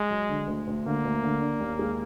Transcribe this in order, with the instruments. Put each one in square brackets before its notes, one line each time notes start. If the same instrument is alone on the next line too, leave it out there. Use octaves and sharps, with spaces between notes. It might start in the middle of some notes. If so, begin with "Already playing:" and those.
Already playing: [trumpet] G#3
[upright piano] F#3
D3
D2
D2
[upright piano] D3 [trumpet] A#3
[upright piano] D2
D3
D4
D#2
G#3